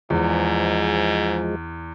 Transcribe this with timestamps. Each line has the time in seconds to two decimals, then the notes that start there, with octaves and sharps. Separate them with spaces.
0.10 E2 G#2 F3 G#3